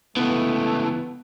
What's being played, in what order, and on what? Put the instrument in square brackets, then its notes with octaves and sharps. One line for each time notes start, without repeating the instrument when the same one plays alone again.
[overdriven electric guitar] C#2 E3 [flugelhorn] A3 [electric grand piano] B3